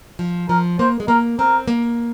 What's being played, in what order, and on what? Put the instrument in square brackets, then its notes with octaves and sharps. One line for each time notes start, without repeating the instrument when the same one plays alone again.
[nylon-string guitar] F3
[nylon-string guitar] F3 [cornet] A#4
[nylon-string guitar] A#3 [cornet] C5
[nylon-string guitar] G#3
[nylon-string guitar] A#3 [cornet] A#4
[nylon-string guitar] C4 [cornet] A#4
[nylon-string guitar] A#3